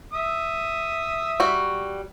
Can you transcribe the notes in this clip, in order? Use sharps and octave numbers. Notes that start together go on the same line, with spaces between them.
E5 D#6
G3 F#4